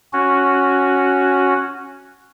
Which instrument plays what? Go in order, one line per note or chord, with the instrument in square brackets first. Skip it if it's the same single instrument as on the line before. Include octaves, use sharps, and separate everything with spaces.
[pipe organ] C#4 F#4